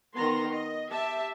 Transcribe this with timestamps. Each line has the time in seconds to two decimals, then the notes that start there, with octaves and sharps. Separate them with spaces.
0.16 D#3 B3 A#5 C6
0.54 D#5
0.90 G4 E5 A5